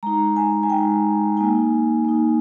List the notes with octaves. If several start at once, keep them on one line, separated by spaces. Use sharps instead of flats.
G#3 D#4 A#5
G#5
G#5
G#3 D#4 G5
A#3 D#4 G#5
A#3 D#4